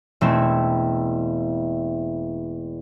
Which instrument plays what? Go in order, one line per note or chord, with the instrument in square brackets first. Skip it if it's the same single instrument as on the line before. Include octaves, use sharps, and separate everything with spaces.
[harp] E1 A3 C4 E4 G#6